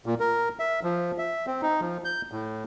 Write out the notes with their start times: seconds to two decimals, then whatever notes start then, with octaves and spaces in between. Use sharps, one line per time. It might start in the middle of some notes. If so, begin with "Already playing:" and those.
0.06 A#2
0.20 A#4
0.59 E5
0.83 F3
1.18 E5
1.47 C4
1.62 D#4
1.81 F3
2.05 G6
2.32 A2